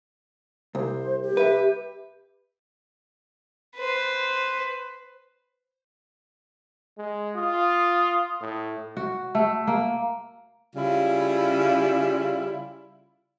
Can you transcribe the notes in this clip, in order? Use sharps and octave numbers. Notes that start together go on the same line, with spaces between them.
C2 C5
G4
B4 E5
B4 C5
G#3
F4 D#6
A2
F#4
A3
A#3
C#3 G3 E4 F4